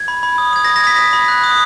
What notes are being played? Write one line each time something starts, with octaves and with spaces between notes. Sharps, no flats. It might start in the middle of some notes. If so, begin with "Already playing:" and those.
Already playing: G#6
B5
B5
D#6
D#6 G#6
A#6
B5
A#6
D#6 B6
D#6
B5
F#6
D#6